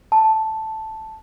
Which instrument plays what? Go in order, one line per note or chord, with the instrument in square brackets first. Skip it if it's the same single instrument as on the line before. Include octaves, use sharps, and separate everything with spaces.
[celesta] A5